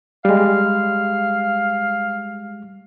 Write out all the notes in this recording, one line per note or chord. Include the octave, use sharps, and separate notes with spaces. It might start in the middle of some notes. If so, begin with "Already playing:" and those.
G3 G#3 F5